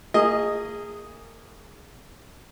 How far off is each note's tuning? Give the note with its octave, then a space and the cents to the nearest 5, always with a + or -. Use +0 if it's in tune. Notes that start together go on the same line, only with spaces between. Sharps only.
A#3 -35 G#4 -15 D#5 +0